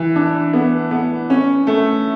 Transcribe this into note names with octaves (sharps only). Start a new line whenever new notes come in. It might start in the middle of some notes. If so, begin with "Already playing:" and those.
Already playing: E3
D4
B3
B3
C#4
A3